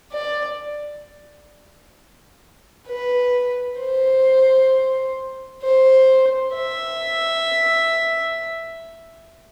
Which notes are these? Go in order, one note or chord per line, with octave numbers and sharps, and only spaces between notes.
D5
B4
C5
C5
E5